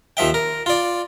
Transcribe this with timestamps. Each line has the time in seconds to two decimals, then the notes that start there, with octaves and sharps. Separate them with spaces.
0.17 D#2 F3 E5 G5
0.34 A#4
0.66 F4 D5